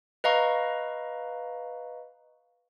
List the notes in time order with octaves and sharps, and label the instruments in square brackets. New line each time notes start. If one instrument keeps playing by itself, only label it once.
[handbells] B4 D#5 F5 A#5 C#6